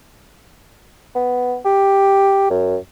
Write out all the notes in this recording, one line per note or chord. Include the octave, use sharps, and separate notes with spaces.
B3
G4
F#2